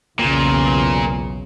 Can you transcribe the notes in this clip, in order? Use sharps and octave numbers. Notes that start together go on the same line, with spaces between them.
B1 E2 A#2 C#3